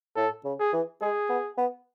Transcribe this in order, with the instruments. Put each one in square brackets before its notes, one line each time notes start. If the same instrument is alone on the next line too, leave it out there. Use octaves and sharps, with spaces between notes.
[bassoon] A2 [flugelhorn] A4
[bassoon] C#3
[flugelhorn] G#4
[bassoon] E3
[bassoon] G#3 [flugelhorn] G#4
[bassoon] B3
B3